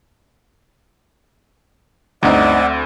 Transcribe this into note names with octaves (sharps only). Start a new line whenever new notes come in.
G1 D2 C4 D#4 D5 E5 F#5